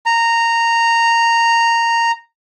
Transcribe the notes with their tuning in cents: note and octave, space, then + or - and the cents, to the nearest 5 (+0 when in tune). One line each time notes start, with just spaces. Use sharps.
A#5 -10